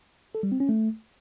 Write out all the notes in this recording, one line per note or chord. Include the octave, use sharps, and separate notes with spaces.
A4
G3
C4
C#4
A3